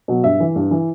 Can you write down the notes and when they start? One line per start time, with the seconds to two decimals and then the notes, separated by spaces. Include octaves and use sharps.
0.08 B2 F#3
0.24 G2 E5
0.40 E3
0.56 G2
0.71 E3